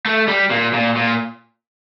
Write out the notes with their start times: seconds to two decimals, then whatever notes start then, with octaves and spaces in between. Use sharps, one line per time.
0.05 A3
0.28 G3
0.51 A#2
0.74 A#2
0.97 A#2